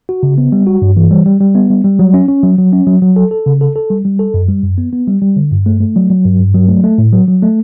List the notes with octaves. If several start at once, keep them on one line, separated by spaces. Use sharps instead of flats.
F#4
C#3
B3
G3
F#4
G2
E3
G3
G3
G3
B3
G3
G3
F#3
C#4
C#4
F#3
F#3
C#4
F#3
F#3
A4
A4
C#3
A4
A4
G3
G3
A4
F#2
G3
F#2
B3
B3
G3
G3
D3
G2
A3
A3
F#3
F#3
G2
G2
F#3
A3
A3
A2
F#3
F#3
A3